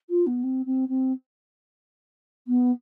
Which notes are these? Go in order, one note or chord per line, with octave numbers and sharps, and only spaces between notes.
F4
B3
C4
C4
C4
B3